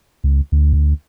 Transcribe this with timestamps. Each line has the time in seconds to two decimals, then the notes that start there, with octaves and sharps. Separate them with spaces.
0.24 C#2
0.52 D2
0.73 D2